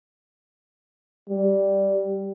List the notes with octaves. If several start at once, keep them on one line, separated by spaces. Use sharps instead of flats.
G3